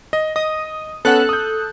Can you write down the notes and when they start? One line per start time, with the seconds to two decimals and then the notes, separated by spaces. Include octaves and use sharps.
0.13 D#5
0.36 D#5 D#6
1.05 B3 C#4 A4 F#5 F#6
1.29 D#6 G6